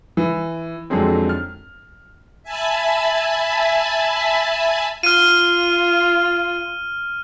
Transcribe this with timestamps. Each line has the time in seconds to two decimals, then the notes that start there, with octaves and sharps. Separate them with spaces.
0.17 E3
0.90 F2 D3 F#3 G#3 C4
1.29 F6
2.43 E5 G#5 A5 B5
5.03 F4 F6 D#7